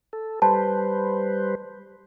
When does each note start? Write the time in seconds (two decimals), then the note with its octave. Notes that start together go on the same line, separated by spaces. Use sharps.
0.13 A4
0.42 G3 B4 C5 A5